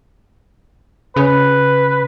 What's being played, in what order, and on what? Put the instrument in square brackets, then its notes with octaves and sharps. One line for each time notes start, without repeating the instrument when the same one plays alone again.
[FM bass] C#3 [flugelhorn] B4